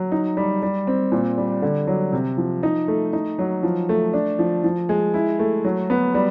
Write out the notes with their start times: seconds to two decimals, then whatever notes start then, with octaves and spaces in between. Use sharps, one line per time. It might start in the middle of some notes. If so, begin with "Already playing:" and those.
Already playing: F#3
0.12 D#4
0.37 G3
0.63 G3
0.87 C4
1.12 A#2
1.38 G3
1.62 D3
1.87 F#3
2.13 C3
2.38 F3
2.63 D#4
2.88 A3
3.13 D#4
3.39 F#3
3.63 F3
3.89 A3
4.14 D4
4.39 F3
4.64 F3
4.89 G#3
5.14 E4
5.39 A3
5.64 F#3
5.90 B3
6.15 G3